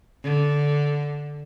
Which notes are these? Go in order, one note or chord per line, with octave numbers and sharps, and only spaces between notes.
D3